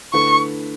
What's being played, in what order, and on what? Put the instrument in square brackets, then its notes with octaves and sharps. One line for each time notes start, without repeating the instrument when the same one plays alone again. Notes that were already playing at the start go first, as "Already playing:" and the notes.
[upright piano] D3 A3 E4 B4 [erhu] C#6